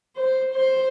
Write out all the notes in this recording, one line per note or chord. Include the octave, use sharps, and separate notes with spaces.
C5
C5